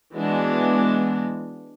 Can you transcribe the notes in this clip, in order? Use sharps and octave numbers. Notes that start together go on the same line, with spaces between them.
E3 G#3 B3 D4 F#4